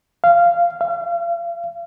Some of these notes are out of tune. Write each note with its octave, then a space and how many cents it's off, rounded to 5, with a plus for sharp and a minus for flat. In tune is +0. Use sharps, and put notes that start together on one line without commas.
F5 -15
F5 -40